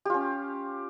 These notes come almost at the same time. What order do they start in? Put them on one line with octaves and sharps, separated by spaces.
G4 F4 C#4